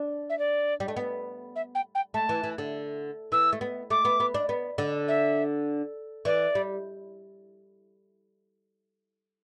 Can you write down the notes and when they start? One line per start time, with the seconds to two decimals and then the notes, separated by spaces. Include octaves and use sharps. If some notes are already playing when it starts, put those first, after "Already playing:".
Already playing: D4
0.29 E5
0.39 D5
0.80 G3
0.88 A3
0.97 B3
1.55 E5
1.75 G5
1.95 G5
2.14 A3 A5
2.29 E3
2.44 E3
2.58 D3
3.32 E3 E6
3.53 A3
3.61 B3
3.90 A3 D6
4.05 B3
4.20 B3
4.34 D4
4.49 B3
4.78 D3
5.08 E5
6.25 E3 D5
6.55 G3